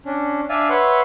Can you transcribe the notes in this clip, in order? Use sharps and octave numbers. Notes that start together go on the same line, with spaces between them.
C#4 D4
D4 D5 E5 F5 G#5
B4 C#5 E5 F#5 C6